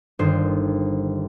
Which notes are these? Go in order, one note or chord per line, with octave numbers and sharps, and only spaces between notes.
G1 G2 D#3 C5